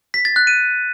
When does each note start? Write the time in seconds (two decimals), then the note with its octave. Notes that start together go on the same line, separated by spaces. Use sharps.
0.14 B6
0.25 A6
0.36 F#6
0.47 D#7